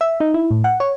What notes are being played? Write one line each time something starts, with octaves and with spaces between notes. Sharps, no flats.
E5
D#4
E4
A2
F#5
C#5